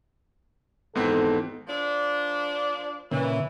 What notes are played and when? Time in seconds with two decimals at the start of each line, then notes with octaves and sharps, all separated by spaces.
0.95 G#1 E2 G#2 B3 C4 A4
1.67 F3 A#3 D4
3.12 A#2 C#3 E3